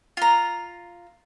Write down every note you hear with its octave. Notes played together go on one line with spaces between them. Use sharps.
F4 A#5